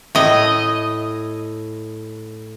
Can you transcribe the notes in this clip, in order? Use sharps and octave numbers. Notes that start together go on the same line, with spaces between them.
A2 D#5